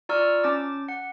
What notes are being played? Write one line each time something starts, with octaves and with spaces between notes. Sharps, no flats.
F4 D5 A#5 C#6 E6 F6
C#4 A5 D6 A6
F#5